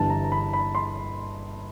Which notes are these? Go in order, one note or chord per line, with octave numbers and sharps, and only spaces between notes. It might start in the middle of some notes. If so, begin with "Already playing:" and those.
Already playing: G1 G2 E3 A5
A#5
A#5
B5
B5
C6